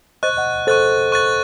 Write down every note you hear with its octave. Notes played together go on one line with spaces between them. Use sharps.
C5 D#5 C#6 F#6 A6
D#5 F#5
A4 C5 C#6 F#6 A6
C#6 F#6 A6